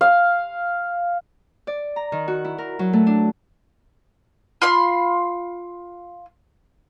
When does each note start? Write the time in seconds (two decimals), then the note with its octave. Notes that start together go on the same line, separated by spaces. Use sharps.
0.01 F5
1.67 D5
1.96 A#5
2.12 D#3
2.28 F#4
2.45 E4
2.58 A#4
2.79 F#3
2.93 A3
3.07 D4
4.62 F4 B5 C6